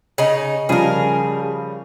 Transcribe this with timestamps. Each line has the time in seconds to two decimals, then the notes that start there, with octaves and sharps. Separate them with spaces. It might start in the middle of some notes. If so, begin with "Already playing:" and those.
0.18 C#3 D#4
0.69 C#3 F3 G3 G#4 A#4